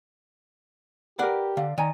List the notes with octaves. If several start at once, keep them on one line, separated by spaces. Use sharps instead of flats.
G4 A#4 B4 D5 F#5
D3 D5 F5
D#3 D5 G#5 A#5